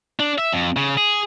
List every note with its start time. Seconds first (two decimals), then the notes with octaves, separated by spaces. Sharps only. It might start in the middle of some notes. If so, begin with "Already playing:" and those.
0.20 D4
0.38 E5
0.53 F2
0.77 C#3
0.97 G#4